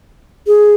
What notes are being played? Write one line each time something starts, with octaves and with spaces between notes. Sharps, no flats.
G#4